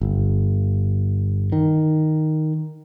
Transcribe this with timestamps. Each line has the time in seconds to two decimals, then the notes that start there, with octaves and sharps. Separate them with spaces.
0.01 G1
1.52 D#3